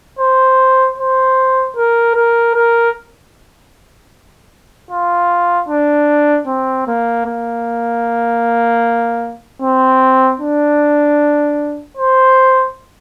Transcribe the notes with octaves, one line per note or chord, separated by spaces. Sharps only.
C5
C5
A#4
A#4
A#4
F4
D4
C4
A#3
A#3
C4
D4
C5